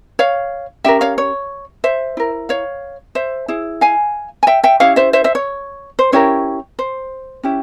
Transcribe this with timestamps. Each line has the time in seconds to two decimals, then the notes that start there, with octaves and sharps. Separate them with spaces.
0.19 C#5 F5
0.84 C#4 G4 A#4 E5 G5
1.01 C#5 F5
1.18 C#5
1.84 C5 E5
2.17 E4 A#4
2.49 C#5 F5
3.15 C5 E5
3.48 E4 G#4
3.81 F5 G#5
4.43 G#5
4.47 E5 G5
4.64 E5 G5
4.80 C#4 E4 G4 C#5 F5
4.96 C5 E5
5.13 C5 E5
5.24 C5 E5
5.35 C#5
5.99 C5
6.12 C#4 E4 G4 A#4 C#5
6.79 C5
7.43 C#4 E4 G4